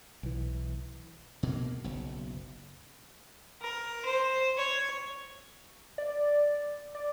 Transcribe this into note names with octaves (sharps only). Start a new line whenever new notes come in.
B1 E3
B2 A#3
F#1 B1
A#4
C5
C#5
D5
D5